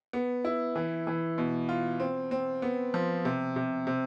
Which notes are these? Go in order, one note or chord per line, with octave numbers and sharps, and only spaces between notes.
B3
E4
E3
E3
B2
F4
C4
C4
B3
F3
C3
C3
C3